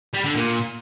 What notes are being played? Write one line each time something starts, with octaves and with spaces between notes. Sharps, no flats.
G3
D3
A#2